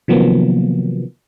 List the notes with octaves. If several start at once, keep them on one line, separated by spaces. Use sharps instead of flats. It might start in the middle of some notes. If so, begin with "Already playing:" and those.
C3 D#3 F3 F#3 A#3 B3